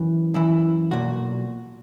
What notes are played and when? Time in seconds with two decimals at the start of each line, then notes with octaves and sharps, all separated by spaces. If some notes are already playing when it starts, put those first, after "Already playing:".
Already playing: F#2 E3
0.34 F#2 E3 E4
0.91 B1 A#2 F#4